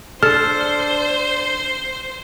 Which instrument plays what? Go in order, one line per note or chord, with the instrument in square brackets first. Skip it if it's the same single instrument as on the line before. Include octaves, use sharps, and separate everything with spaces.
[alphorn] D4 [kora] A4 [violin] C5 [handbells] F6